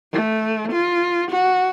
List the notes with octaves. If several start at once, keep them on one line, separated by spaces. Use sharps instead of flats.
A3
F4
F#4